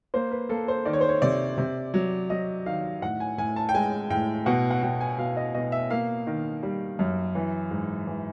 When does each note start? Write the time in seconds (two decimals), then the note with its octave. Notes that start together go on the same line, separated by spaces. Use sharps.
0.14 A#3 C5
0.31 B4
0.49 A#3 A4
0.68 C5
0.85 D#3 D5
0.93 C#5
1.01 C5
1.09 C#5
1.22 C3 D5
1.58 C3
1.94 F#3
2.30 F#3 D#5
2.66 D#3 F5
3.02 A2 F#5
3.20 G#5
3.38 A2 G#5
3.56 A5
3.69 G5
3.75 G#3 G#5
4.10 A2 G5
4.46 B2 F#5
4.71 F#5
4.82 B2 G5
5.01 G#5
5.18 B2 F5
5.37 D#5
5.54 B2 D#5
5.72 E5
5.90 A#3 F5
6.27 D#3
6.63 G3
6.99 F#2
7.35 E3
7.71 G#2
8.07 E3